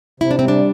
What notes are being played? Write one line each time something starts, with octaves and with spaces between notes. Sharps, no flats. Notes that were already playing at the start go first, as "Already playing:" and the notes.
C3 E4
D4
G3 C4
D4